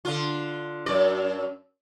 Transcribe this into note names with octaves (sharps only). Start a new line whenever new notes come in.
D3 F4
F#2 D5